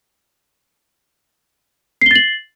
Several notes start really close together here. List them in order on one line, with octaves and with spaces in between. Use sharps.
C7 G7 A6 F#7